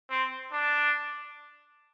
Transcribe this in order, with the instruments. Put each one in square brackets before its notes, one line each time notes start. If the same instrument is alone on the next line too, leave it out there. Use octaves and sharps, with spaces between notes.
[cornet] C4
D4